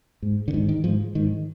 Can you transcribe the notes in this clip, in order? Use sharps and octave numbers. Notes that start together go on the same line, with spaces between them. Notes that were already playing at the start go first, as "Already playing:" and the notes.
G#2
D3
G#2 D#3
D#3
G#2 F3
G#2 D#3